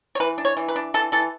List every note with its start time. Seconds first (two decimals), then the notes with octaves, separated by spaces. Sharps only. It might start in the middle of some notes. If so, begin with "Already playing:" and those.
0.15 C#5
0.20 E3 B4
0.38 D4
0.45 C#5
0.57 E3
0.68 B4
0.76 D4
0.94 E3 A4
1.12 E3 A4